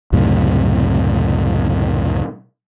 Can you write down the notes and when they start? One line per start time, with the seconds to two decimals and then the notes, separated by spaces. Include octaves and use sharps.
0.12 C#2 F#2 A2 C3